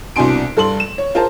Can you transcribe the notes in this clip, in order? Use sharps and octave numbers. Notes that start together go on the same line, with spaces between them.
C2 B2 D4 G#5 C6 D7
G2 A4 C6 F#7
E7
C#5
F4 G#4 A#4 C5 A5